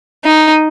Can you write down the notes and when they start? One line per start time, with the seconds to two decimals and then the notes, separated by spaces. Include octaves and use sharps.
0.25 D#4